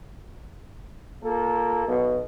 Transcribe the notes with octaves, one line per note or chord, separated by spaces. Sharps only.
A#3 F4 A4
B1 B2